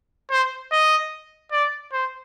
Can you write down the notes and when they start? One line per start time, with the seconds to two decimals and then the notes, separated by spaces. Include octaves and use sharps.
0.31 C5
0.72 D#5
1.52 D5
1.93 C5